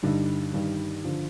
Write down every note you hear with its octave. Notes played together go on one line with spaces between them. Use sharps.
G2 D3 G3 D#4
G2 D#3 G3
D3 F3